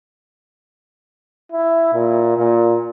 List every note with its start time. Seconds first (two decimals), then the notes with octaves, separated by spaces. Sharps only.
1.52 E4
1.94 A#2
2.37 A#2